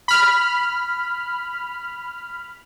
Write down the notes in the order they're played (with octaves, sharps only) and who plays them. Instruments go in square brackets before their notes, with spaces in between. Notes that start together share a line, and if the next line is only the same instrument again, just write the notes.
[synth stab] B5 F6